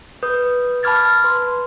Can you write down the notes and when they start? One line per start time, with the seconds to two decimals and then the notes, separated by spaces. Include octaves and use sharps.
0.23 B4 D#6 G6
0.83 A5 B5 D6 F6 G#6 A6
1.24 B4 C6